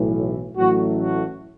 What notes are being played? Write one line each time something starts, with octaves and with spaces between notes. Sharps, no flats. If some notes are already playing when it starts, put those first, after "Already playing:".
Already playing: B1 A2 E3
A1 A2 F#3 A3 F#4
F#4